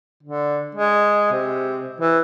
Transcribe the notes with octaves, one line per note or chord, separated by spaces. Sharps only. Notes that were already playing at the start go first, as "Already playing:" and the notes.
D3
G#3
C3
E3